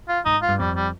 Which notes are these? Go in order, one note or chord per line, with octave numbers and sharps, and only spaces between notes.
F4
G#2 D#4
F4
G2
F2 G3
G3